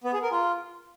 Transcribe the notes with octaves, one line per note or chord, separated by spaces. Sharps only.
B3
G#4
A#4
F4